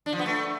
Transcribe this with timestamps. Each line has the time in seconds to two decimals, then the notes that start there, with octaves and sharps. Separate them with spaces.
0.06 D4
0.13 F3
0.19 B3
0.26 A3